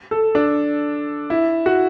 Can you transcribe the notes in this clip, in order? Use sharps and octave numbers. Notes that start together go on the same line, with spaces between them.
A4
D4
E4
F#4